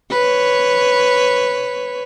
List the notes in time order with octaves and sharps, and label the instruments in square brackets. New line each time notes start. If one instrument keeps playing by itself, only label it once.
[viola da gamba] B4 C#5